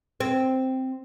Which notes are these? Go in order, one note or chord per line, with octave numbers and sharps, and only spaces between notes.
C4